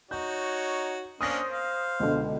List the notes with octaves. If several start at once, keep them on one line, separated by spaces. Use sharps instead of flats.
D#4 F#4 C#5 G6
A#3 C#4 D4 C5 D#6 A#6
F5
C#2 B2 D3